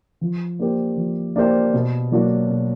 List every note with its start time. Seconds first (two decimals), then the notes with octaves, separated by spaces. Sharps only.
0.21 F3
0.59 A#3 D4 G4 C5
0.96 F3
1.36 A#3 D4 G4 C5
1.73 B2
2.12 F#3 A#3 D4 F#4
2.50 B2